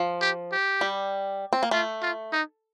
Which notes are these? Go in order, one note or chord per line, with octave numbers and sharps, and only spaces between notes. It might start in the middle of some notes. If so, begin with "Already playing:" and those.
Already playing: F3
G4
G4
G3
C4
A#3
A3 F4
F4
D#4